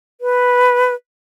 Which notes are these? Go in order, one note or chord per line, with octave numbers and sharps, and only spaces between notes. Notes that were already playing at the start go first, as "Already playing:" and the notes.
B4